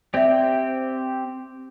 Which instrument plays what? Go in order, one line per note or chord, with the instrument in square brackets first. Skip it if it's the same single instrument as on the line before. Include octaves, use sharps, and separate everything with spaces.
[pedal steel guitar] C4 G4 [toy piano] D5 E5